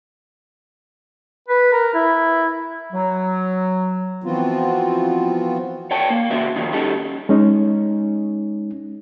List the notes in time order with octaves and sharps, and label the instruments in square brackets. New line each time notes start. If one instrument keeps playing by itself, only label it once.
[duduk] B4
A#4
E4
[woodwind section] F#3
[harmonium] E3 F3 B3 C4 F4 F#4
[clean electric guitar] C#5 D5 G5 A5
A#3
E2 C#3 F#4 C5 E5
A#2 D#3 F3 D#4
G3 C#4 D#4 A4
[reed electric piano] G#3 C#4 D#4